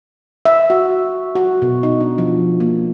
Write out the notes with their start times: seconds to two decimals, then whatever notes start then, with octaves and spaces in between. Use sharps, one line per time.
0.45 E5
0.70 F#4
1.35 F#4
1.62 B2
1.83 D#4
2.00 D4
2.18 F3
2.60 A#3